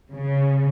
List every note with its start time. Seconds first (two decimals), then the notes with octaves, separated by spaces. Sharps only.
0.13 C#3